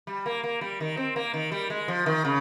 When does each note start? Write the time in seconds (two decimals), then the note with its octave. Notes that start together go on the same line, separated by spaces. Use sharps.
0.07 G3
0.26 A#3
0.44 A#3
0.61 G3
0.80 D#3
0.97 C4
1.16 A#3
1.34 D#3
1.52 G3
1.70 G#3
1.88 F3
2.06 D#3
2.25 C#3